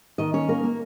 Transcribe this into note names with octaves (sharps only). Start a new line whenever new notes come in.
D#3 D#5
C#4 C#5
A#3 A#4
A#3